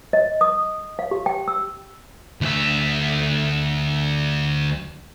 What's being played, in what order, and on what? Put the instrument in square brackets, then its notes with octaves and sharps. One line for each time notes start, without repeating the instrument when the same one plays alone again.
[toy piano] D#5
D#6
F5
G4
G5
E6
[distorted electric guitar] D2 E5